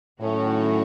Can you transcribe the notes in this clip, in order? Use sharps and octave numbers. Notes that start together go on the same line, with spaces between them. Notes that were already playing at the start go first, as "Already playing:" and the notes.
A2 D#3 F#3 C#4 F#4